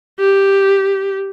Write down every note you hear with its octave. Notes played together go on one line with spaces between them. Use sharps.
G4